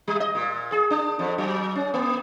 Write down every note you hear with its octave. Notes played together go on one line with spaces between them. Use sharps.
G3
D#5
A#2
G#4
D4
F2
F#3
C#4
A#3